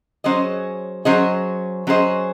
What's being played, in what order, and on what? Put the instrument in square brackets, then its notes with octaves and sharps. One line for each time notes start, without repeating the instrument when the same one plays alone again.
[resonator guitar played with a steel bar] F#3 C#4 G#4 C5 D#5
F#3 C#4 G#4 C5 D#5
F#3 C#4 G#4 C5 D#5